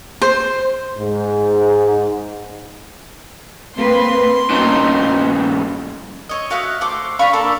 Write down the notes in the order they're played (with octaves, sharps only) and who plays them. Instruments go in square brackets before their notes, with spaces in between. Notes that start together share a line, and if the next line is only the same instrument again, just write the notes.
[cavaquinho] C5
[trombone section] G#2
[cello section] A#3 C4 B4 [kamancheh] C6
[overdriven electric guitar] G2 C#3 [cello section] A#3 F#4 [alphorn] D#4
[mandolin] C#5 D#5
F#4 E5 F5 F#6
A3 C5 D6
D4 F5 B5 C#6
A#3 D4 A4 A#4